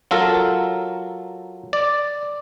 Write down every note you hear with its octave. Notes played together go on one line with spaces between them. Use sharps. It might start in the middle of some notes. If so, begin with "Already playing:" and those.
F#3 F4 A4 A#4
D5